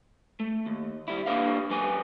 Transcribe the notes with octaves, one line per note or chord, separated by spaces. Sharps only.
A3
D#2
G3 E4
A#3 D4 G4 B4 F5
F#2 F#3 B4 G#5